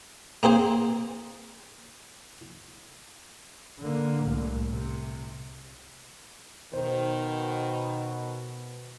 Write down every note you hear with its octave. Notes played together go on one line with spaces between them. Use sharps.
A#3 C4 G#4 C5
D3 A#3
C2 A2
C3
B2 D#3 C5